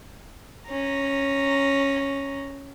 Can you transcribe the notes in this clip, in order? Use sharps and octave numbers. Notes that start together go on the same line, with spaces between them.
C#4 A#5